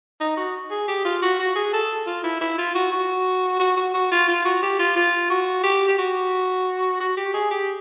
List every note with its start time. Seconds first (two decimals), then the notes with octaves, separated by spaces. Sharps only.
0.20 D#4
0.37 F#4
0.71 G#4
0.88 G4
1.05 F4
1.22 F#4
1.39 F#4
1.55 G#4
1.73 A4
2.06 F4
2.24 E4
2.41 E4
2.58 F4
2.74 F#4
2.92 F#4
3.60 F#4
3.76 F#4
3.94 F#4
4.11 F4
4.28 F4
4.45 F#4
4.62 G4
4.79 F4
4.96 F4
5.30 F#4
5.63 G4
5.88 G4
5.98 F#4
7.00 F#4
7.17 G4
7.34 G#4
7.51 G4